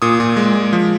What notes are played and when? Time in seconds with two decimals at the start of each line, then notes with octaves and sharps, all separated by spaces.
0.02 A#2 D#6
0.20 A#2
0.37 G#3
0.54 G#3
0.73 F3